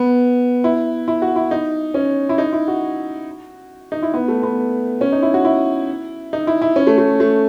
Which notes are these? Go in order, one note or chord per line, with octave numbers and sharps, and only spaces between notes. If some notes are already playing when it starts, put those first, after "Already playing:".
Already playing: B3
E4
E4
F#4
E4
D#4
C#4
E4
D#4
E4
F#4
D#4
E4
B3
A3
B3
C#4
D#4
E4
F#4
E4
D#4
E4
E4
C#4
A3
A3
A3